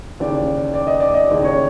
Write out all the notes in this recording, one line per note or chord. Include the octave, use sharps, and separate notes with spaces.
D#2 C#3 E3 D5
D5
D#5
D5
D#5
D#2 C#3 E3 D5
C#5